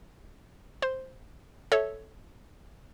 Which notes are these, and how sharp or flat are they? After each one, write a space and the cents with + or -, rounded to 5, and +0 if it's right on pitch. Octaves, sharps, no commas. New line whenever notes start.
C5 +0 C6 +0
A4 -10 C#5 +0 E5 -15